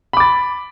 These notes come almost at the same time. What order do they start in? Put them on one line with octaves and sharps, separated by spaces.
B5 D6 A6